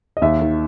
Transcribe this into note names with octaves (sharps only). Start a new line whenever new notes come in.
D#5
D#2 E5
D#3